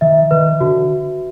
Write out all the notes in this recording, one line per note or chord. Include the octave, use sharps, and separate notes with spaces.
D#3 E5
D#3 B4
D3 F#4